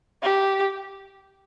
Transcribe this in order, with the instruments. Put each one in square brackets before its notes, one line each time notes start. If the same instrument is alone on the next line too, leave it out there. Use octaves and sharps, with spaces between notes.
[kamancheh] G4